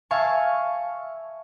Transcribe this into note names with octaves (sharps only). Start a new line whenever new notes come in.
E5 F5 G#5 A5 C#6